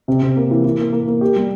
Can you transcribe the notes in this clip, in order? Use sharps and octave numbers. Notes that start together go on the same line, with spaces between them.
C3
C3
A#3
E3
E3
A#3
A#3
A#3
G4
G3